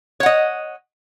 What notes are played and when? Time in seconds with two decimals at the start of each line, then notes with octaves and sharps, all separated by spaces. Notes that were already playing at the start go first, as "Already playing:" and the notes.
0.20 C#5
0.23 F#5
0.26 D#5